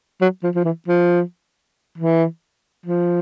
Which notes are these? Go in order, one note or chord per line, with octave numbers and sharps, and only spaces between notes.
F#3
F3
F3
E3
F3
E3
F3